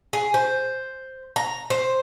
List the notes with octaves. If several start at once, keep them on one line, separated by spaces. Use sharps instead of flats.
G#4
C5
A#5
C5